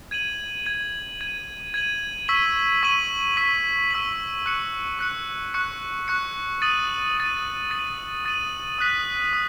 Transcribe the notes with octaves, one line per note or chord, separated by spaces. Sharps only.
G#6 D#7 F#7
G#6 D#7 F#7
G#6 D#7 F#7
G#6 D#7 F#7
C#6 E6 B6 D#7 F#7
C#6 E6 B6 D#7 F#7
C#6 E6 B6 D#7 F#7
C#6 E6 B6 D#7 F#7
C#6 F#6 C#7
C#6 F#6 C#7
C#6 F#6 C#7
C#6 F#6 C#7
D#6 A6 D#7 F#7
D#6 A6 D#7 F#7
D#6 A6 D#7 F#7
D#6 A6 D#7 F#7
D#6 F#6 B6
D#6